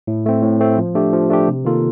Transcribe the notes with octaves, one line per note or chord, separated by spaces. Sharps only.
A2
A3 C4
A2
A3 C4
F3
A3 D4 G4
F3
A3 D4 G4
C3
D#3 A#3 F4 A4